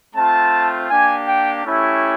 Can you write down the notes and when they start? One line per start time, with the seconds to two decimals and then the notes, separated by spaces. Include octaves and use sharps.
0.15 A3 C4 F4 A5
0.89 A#3 D4 G4 G#5
1.27 G5
1.64 A3 C#4 E4 G4